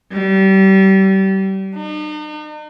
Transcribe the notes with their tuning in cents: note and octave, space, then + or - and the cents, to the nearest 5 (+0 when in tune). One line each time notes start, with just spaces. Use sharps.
G3 -30
D#4 -45